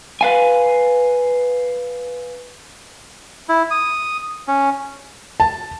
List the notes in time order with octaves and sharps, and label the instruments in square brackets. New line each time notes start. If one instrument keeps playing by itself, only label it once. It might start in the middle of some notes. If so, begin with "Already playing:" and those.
[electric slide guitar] B4 F5 G#5
[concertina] E4
D#6
C#4
[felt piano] A5